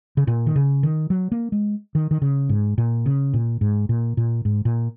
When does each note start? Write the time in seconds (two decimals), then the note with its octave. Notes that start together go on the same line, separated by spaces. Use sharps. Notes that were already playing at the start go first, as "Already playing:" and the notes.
0.17 C#3
0.27 A#2
0.46 D#3
0.56 C#3
0.83 D#3
1.10 F#3
1.32 A#3
1.52 G#3
1.95 D#3
2.11 D#3
2.22 C#3
2.49 G#2
2.78 A#2
3.06 C#3
3.33 A#2
3.61 G#2
3.89 A#2
4.17 A#2
4.45 G#2
4.65 A#2